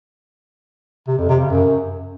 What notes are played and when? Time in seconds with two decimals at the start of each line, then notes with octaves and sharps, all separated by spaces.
1.08 C3
1.18 F2
1.29 C3
1.40 C#3
1.50 F#2